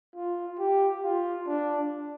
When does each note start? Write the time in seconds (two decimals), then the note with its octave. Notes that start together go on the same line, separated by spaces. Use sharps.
0.15 F4
0.59 G4
1.03 F4
1.47 D4